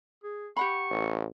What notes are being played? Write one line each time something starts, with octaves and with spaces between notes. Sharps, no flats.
G#4
G4 F#5 B5 C#6
A1